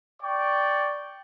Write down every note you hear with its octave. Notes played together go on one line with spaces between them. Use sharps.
D5 G5 C#6